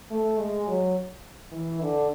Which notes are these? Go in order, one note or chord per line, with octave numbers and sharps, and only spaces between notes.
A3
G#3
F#3
E3
D3